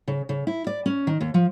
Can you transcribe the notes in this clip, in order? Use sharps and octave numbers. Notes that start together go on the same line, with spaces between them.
C#3
C#3
E4
D5
C#4
D#3
D#2
F3